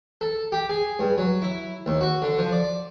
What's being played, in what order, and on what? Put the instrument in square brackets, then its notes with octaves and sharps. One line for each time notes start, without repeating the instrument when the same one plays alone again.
[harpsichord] A4
G4
G#4
G2
F#3
E4
D#2
F#4
D3
F3
D5